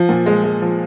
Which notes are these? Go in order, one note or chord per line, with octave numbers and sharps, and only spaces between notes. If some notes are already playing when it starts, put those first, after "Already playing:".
Already playing: F3
A#2
G#3
G#3
F3